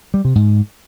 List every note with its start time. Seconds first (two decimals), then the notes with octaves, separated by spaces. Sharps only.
0.14 G3
0.25 C3
0.35 G#2